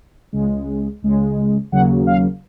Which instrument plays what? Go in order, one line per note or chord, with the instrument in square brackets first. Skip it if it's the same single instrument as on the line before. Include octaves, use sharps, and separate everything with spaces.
[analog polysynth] C#2 C#3 G#3
C#2 C#3 G#3
D#2 C#3 F#3 A#3 F#5
F5